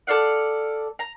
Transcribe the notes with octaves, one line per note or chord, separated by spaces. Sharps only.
A4 D5 F5 F#5
A#5